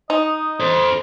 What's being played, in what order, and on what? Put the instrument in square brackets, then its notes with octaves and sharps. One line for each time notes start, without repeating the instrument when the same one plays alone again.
[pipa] D#4 [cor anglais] D#5
[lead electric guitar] A4 C5